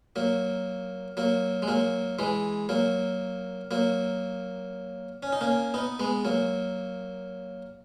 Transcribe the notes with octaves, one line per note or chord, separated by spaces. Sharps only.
F#3 A#3
F#3 A#3
G#3
F#3 A#3
E3 G#3
F#3 A#3
F#3 A#3
C#4
D#4
A#3 C#4
B3 D#4
G#3 B3
F#3 A#3